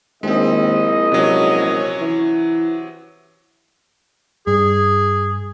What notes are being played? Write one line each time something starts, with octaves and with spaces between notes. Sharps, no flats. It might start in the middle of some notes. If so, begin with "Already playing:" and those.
A#1 D#2 G#3 C4 E4 D#5
C#2 C3 F#3 C#4 C#5
E3
G2 G#4